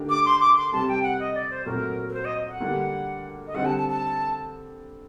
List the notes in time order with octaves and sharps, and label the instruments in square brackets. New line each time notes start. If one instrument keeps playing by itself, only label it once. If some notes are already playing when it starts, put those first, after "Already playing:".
Already playing: [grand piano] D3 A3 D4 G4 A#4
[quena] D6
C6
D6
C6
[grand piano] C3 G3 C4 G4 [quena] A5
[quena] G5
F#5
D#5
D5
C5
[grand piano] A#2 F#3 A3 C4 F#4 [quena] A#4
[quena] A#4
C5
D#5
F#5
[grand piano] D3 G3 A#3 D4
[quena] D#5
[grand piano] D3 G3 C4 [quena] F#5
[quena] A5
A5
A5